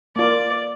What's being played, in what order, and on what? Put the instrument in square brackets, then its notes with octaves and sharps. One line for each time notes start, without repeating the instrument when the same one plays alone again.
[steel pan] A#3 F4 A#4 [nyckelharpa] D5